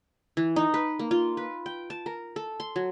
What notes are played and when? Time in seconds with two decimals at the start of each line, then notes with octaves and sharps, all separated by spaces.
0.37 E3
0.56 D#4
0.74 B4
0.99 A#3
1.11 F4
1.37 B4
1.66 G5
1.90 A5
2.06 A#4
2.36 A4
2.60 C6
2.76 F#3